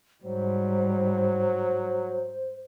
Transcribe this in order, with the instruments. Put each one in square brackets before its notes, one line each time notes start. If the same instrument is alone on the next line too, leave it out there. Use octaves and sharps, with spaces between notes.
[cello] G#2 G3 [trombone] F#3 [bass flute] C5